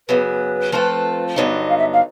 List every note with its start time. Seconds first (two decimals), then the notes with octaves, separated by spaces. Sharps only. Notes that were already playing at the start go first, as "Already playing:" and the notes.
0.08 F#2 C#3 F#3 B3 B4
0.72 F3 A3 C4 F4 A4
1.36 G2 D3 F#3 B3 D#4 C#5
1.53 D5
1.61 D#5
1.69 F5
1.77 E5
1.93 F5